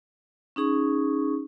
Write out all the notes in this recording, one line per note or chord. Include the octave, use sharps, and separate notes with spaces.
C#4 D#4 G#4 C#6